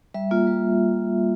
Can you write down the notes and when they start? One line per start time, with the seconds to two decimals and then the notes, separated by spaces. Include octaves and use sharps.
0.14 G3 E5
0.31 A#3 F4
0.47 G3